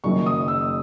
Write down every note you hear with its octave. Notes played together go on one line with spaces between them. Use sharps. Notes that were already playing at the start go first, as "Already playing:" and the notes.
F#1 F#2 D#3 C#6
D#6
E6